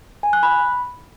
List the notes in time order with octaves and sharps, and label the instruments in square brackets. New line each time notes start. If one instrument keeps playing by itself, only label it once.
[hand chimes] G#5
F#6
B5